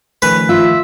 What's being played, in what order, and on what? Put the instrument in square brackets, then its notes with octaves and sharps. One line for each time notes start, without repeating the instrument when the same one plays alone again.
[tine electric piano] D#3 F3 A3 [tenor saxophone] C#4 [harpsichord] B4
[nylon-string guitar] F4 [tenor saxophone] E5